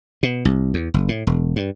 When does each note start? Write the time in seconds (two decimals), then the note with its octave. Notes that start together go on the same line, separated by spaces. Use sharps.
0.23 B2
0.45 C2
0.74 E2
0.94 F#1
1.09 A2
1.27 E1
1.56 G2